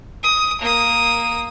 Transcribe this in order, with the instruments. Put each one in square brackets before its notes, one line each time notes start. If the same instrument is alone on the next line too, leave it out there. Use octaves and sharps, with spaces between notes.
[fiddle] D#6
A#3 D#6